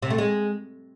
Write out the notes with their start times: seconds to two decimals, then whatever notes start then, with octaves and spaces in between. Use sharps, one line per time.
0.02 C3
0.10 A3
0.18 G#3